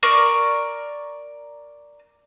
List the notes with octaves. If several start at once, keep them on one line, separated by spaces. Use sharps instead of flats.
A#4 D5 C#6